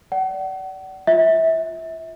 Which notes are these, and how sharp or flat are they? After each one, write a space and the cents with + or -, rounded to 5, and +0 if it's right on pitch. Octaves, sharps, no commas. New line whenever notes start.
D5 -10 F#5 +35
F4 +0 E5 -25